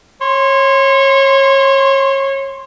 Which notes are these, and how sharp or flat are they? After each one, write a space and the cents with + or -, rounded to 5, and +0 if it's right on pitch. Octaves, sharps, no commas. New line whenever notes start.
C#5 -25 C6 +0